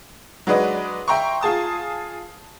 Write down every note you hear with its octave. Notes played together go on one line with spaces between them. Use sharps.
F#3 G#3 D4 B4 D5 D#5
E5 G5 A#5 C6 C#6
F4 G#4 A5 D#6